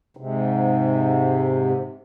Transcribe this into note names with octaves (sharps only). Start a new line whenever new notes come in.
G#2 C3